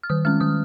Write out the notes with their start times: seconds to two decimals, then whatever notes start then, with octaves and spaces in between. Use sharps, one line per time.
0.03 F6
0.10 D#3 D#6
0.25 G#3 C#4 F6
0.41 D#3 D#6